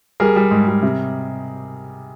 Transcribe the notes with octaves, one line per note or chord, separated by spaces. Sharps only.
G3 G#4 A#4
G3
G#2
G3
C3